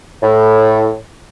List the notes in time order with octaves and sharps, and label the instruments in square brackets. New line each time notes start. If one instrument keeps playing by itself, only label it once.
[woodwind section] A2